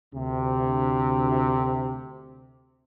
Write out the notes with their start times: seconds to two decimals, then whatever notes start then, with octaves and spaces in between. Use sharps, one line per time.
0.14 D2 C3